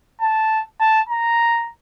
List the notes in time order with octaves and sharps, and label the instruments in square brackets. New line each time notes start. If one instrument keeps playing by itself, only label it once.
[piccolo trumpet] A5
A5
A#5